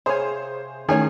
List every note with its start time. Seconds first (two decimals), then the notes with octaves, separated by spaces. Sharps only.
0.06 C3 G#4 C5 C#5 F5 G#5
0.89 D#3 E3 A3 C#4 G#4 C#5 G#5